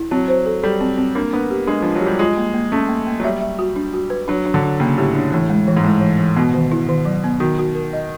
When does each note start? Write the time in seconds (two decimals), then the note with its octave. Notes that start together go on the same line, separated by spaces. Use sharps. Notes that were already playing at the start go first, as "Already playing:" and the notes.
Already playing: E4
0.11 F#3 C4
0.28 C5
0.46 A4
0.63 G3 A4
0.80 C4
0.97 C4
1.15 A#3 D4
1.33 B3 D4
1.50 G4
1.67 G#3 D4
1.82 F3 D4
1.95 F#3
2.02 G3 G4
2.19 G#3 F4
2.37 A#3
2.54 A#3
2.72 A3 C#4
2.89 A#3
3.06 A#3
3.20 F#3
3.24 G3 E5
3.41 E5
3.59 F#4
3.76 D4
3.93 F#4
4.10 B4
4.28 F#3 D4
4.45 D4
4.54 D3
4.63 D4
4.80 C#3 A#3
4.98 A2 G4
5.15 D4
5.32 A2 E3
5.50 G#3
5.68 E3
5.77 G#2
5.84 A2 G#3
6.01 E3
6.19 E3
6.36 B2 B3
6.54 D#3
6.72 E4
6.89 D#3
7.05 F#3
7.24 B3
7.40 D#3 F#4
7.59 F#4
7.75 A#4
7.93 D#5